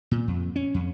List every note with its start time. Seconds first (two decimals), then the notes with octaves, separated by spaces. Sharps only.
0.11 A#2
0.27 F2
0.56 C#4
0.74 F2